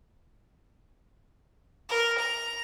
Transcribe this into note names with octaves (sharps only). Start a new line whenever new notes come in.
A#4
A#5